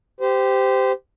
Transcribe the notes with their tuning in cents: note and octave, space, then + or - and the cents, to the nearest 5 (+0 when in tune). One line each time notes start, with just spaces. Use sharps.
G4 +0 C5 -25